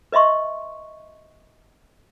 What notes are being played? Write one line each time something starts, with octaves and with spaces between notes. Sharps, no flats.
B4 D#5 E5 C6 C#6